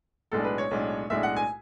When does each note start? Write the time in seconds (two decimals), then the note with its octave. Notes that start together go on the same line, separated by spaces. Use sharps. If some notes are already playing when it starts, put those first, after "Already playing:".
0.32 B1 A2 G#3 D4 A4
0.44 B4
0.58 C#5
0.71 B1 A2 G#3 D4
1.10 B1 A2 G#3 D4 E5
1.23 F#5
1.36 G#5